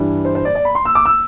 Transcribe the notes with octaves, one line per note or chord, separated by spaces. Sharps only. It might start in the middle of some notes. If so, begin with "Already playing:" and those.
Already playing: G2 E3 G3 D4
C5
C5
D5
D5
B5
C6
E6
D6
E6